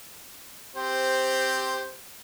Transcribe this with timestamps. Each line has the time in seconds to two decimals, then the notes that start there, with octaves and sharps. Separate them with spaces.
0.76 C4 G4 C5